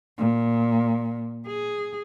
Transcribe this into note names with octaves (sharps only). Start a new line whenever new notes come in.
A#2
G#4